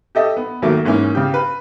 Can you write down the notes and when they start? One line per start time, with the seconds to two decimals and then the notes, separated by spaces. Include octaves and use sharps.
0.15 G4 A4 D#5 E5
0.37 B3
0.62 D#2 F#3 A3 A#3
0.85 G#2 E3 A#3 C#4
1.15 C#3 G4
1.34 B4